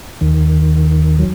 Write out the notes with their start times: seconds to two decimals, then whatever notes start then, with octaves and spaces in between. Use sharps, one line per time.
0.21 D#2 D#3
1.19 F#3